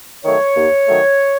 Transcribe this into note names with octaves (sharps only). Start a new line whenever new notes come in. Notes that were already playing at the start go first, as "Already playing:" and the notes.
D#3 F#3 A3 C#5
D#2
D#3 F#3 A3